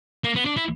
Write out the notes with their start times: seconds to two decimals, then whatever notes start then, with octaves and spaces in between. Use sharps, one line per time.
0.24 A#3
0.35 B3
0.45 D4
0.57 E4